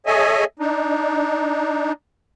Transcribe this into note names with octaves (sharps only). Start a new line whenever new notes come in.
G#4 A4 C#5 D#5 E5 G#5
D4 D#4